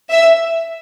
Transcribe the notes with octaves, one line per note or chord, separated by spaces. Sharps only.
E5